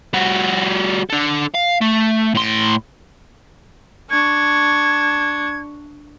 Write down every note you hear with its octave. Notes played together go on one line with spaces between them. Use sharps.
G3 F#4
D4 A4
F5
A3
A2 C6
D4 C#6 G#6